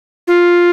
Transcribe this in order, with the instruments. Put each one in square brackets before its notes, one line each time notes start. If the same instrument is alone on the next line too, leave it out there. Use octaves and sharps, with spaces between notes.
[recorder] F4